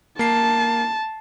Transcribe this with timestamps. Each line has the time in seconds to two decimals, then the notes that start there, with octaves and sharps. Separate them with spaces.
0.19 A#3 A5 C7